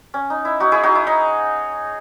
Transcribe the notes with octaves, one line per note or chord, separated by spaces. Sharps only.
C#4
D#4
E4
D#4 F#4
E4 G#4
D#4 F#4
E4
D#4